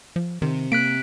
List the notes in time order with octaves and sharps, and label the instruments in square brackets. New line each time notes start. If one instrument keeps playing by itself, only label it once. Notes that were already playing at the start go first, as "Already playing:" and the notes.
[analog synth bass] F3
[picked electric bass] C3 [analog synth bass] D#3
[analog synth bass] A#3 [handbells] F#6 B6 D7